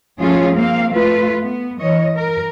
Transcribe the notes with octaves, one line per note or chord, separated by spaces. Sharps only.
F3 A3 C#4 F4 G#4
A#3 C4 F5
A3 F4 B4
B3
E3 C#5 D#5
A#4